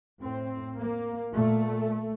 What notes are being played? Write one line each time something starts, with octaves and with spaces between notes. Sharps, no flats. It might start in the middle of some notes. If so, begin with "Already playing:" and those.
A2 C4
A#3
A#2 A3